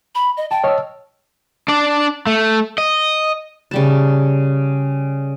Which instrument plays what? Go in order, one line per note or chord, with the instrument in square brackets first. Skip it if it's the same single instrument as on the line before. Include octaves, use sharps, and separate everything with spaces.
[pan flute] B5
D#5
[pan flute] G5 [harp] A5
[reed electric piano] C#5 D#5 [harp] E6 F6
[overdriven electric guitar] D4 D5
A3
D#5
[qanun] C#3 G3 A5